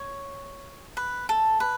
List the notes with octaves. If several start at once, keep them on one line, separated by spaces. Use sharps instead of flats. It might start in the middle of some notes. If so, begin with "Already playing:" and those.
Already playing: C#5
B4
A4
B4